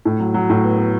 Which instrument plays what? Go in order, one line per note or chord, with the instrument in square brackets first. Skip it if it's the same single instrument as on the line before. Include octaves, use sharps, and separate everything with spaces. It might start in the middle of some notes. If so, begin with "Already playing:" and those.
[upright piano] A2
F#3
F#3
A2
B3
B3